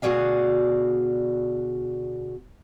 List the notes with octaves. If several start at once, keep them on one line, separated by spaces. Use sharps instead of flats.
D2 B2 F#4 G#4 D5 F5